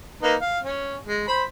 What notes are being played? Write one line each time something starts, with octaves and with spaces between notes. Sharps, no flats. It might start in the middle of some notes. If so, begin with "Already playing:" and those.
A#3 D#4 B4
F5
C#4
G#3
C5 B5